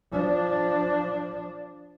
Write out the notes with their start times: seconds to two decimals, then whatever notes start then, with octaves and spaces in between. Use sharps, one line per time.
0.12 F3 D4